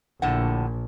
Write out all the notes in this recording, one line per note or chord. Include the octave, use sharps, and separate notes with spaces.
A#1 A2 D3 F#5